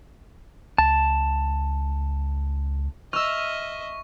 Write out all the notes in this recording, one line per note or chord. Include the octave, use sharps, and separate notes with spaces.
C#2 A5
D#5 E5 C#6 E6 F6